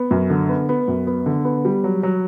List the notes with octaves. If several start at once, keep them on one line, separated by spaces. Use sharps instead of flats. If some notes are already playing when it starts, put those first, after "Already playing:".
Already playing: B3
F#2
D3
B3
B3
F#2
B3
D3
B3
G3
F#3
F#3